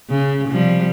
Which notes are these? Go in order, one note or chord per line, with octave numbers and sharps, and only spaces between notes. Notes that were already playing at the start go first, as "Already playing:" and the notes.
C#3
C3 F3 G3